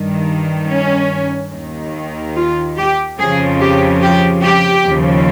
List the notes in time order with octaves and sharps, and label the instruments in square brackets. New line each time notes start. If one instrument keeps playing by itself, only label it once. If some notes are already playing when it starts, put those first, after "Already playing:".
Already playing: [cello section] G2 D#3
C#4
D#2 D#3
F4
G4
F2 C#3 F3 G#4
G4
G4
G4
D#2 C#3 F3